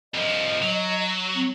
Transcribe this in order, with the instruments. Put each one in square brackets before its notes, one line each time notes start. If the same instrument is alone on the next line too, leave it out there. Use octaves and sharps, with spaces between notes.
[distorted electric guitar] C2 F3 [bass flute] D#5
[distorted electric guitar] F#3
[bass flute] C4